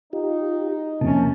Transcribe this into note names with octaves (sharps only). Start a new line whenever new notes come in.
D#4 F4 G4
F2 C3 A#3 C#4 A5